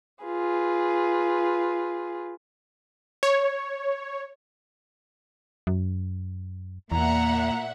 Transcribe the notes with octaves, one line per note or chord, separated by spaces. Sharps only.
F4 G#4 B4
C#5
F#2
E2 A#2 E5 F#5 A#5